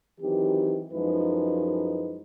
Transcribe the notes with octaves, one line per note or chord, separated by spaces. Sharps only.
D#3 E3 F#3 C4 G4
F#2 F3 G#3 D#4 E4 B4